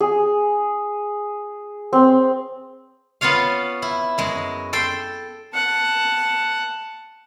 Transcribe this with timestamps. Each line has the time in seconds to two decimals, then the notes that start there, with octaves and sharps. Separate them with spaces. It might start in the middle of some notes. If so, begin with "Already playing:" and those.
0.01 G#4
1.93 C4
3.21 B3 C#4 F4 C#5 F5
3.82 E4
4.18 F#2 G#3
4.73 A4 G5 C6
5.54 F#5 A5